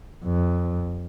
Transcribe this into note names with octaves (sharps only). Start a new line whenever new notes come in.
F2